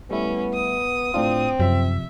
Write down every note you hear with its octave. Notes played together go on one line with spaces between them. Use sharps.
G3 A3 B3 C#4 E4
D#6
A2 C4 D4 F4
F#2 C3 F3 E5